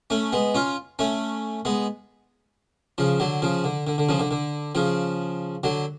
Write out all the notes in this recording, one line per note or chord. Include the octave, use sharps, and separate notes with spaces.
A3 C#4
G#3 B3
C#4 F4
A3 C#4
G#3 B3
C#3 F3
D3 F#3
C#3 F3
D3
D3
D3
C#3 F3
D3
D3
C#3 F3
D3 F#3